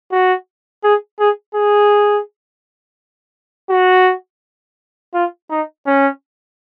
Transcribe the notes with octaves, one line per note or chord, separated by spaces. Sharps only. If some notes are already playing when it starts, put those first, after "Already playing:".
F#4
G#4
G#4
G#4
F#4
F4
D#4
C#4